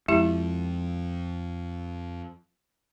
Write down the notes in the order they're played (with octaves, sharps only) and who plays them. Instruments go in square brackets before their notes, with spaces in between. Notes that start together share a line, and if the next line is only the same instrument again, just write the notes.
[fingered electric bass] F2 [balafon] G#3 E4 G4